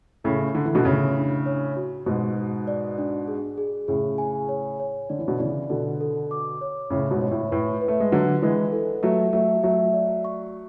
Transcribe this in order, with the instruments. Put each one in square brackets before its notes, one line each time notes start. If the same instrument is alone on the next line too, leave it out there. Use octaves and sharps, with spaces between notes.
[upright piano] A2 C#3 [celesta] A4
[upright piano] D3 [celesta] A4
[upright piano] E3
B2 D3
[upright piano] A2 C#3 [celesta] C#5
[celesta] D4
C#5
F#4
[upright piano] G#2 B2 [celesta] F#4
[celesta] F#4
D5
D4
G#4
G#4
[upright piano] A2 C#3 [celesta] G#4
[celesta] G#5
C#5
C#5
[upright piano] D3 [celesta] D5
[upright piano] E3
B2 D3
[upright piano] C#3 E3 [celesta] D5
[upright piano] B2 D3 [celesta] A4
[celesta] A4
D6
C#5
[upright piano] A2 C#3 [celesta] C#5
[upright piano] G#2 B2
[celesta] C#5
[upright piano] A2
[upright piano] A2 [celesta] B4
[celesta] B4
[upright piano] A3
G#3
[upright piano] D3 F#3 [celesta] F#5
[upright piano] E3 G#3 [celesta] B4
[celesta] A4
[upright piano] F#3 A3 [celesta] E5
[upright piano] F#3 A3 [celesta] E5
[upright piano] F#3 A3 [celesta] E5
[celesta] D5
C#6